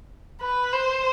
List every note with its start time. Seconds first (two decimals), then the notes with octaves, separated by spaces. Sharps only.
0.41 B4
0.73 C5